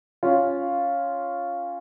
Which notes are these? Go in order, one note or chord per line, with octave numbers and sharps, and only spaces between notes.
C#4 F4